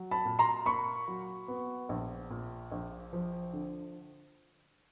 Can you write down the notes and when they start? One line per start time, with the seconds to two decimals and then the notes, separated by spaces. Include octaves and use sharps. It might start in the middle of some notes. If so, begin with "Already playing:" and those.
Already playing: F#3
0.11 A5 B5
0.25 A#2
0.39 A#5 C6
0.65 A#3 B5 C#6
1.08 F#3
1.48 B3
1.89 A#1
2.30 A#2
2.72 A#1
3.13 F3
3.53 D3